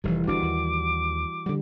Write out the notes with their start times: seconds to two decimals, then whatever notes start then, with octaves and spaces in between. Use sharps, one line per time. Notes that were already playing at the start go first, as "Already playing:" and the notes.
0.04 F1 D#3 E3 G3
0.28 G1 E3 D4 F#4 D6
0.42 D#2
1.46 D3 G3